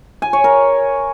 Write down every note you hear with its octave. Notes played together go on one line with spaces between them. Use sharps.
G#5
C#5
A#4